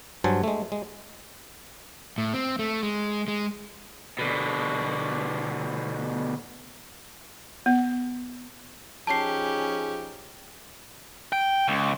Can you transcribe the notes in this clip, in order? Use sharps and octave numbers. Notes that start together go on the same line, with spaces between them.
G2 F#3 C5 G#5 A5
G#3 A3
G#3
A2
C4
A3
G#3
G#3
B2 D3
B3
F3 C#4 D#4 G4 G#4 A5 C7
G5
C#2